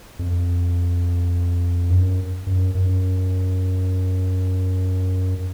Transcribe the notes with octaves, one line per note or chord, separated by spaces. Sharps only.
F2
F#2
F#2
F#2